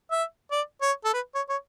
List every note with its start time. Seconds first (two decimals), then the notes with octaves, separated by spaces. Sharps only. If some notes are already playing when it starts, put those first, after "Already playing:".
0.11 E5
0.51 D5
0.82 C#5
1.05 A4
1.13 B4
1.35 C#5
1.49 C#5